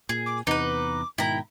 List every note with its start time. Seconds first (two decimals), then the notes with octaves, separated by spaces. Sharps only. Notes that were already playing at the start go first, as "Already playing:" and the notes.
0.09 A#2 G#4
0.26 D6
0.47 E2 C3 B3 D#4 B4 D6
1.18 G#2 B2 D#3 E4 G5 A#5